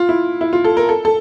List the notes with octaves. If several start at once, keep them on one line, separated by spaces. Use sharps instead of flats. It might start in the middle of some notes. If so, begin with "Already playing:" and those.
Already playing: F4
E4
E4
F4
A4
A#4
A4
A4